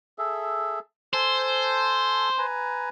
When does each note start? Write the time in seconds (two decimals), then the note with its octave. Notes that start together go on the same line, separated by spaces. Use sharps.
0.18 G#4 A4 E5
1.13 A4 C5 G#5 A5
2.38 B4 G#5 A#5